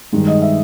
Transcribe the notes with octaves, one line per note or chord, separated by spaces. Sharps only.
G2 D#3 G#3
D#5
E5